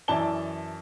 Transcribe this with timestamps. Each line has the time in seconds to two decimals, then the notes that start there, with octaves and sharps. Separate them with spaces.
0.08 F#2 E3 D5 A5 G7